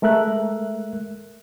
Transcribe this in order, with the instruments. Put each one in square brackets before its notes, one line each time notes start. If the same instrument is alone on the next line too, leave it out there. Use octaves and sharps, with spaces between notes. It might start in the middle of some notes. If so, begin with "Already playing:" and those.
[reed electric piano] G#3 A3 A#4 E5 F#6